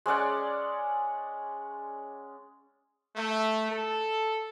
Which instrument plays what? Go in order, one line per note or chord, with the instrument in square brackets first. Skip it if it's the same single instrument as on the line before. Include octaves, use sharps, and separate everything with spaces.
[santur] G#3 C#4 D5 F#5
[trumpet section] A3
A4